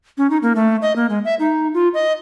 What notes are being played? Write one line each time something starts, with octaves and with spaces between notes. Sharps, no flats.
C#4
D#4
A#3
A3
D#5
A#3
G#3
E5
D#4
F4
D#5